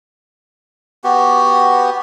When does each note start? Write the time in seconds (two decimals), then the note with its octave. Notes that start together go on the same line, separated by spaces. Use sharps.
1.04 B3 F#4 G4